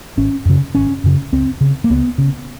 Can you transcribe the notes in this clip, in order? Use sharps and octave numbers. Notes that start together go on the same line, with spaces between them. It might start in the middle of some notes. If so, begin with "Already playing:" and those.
G#1 C#4
F#2 C#3
G#1 C#4
F#2 C#3
C#2 C4
C#3
A#3
C#2 B3
C#3